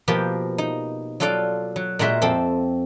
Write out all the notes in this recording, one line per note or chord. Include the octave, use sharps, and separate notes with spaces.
B2 F3 A#3 G4
D#4
F#3 F4 A4 D5 F5
F#3
A#2 G#3 F#4 A#4 E5 C6
F2 C4 A4